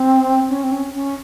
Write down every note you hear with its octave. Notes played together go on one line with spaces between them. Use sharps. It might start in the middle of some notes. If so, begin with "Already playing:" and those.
Already playing: C4
C#4
C4
C#4
C#4